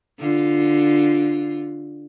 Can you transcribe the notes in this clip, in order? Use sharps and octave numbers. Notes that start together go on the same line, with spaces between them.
D3 F4